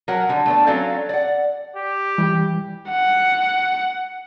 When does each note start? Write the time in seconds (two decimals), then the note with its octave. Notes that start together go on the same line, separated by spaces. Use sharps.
0.08 F#3 A#4 F#5
0.29 D3 G3
0.46 A3 B3 D4
0.67 F#3 C4 C#4 A4 D5 F5
1.09 D5 F#5
1.75 G4
2.18 E3 G3
2.90 F#5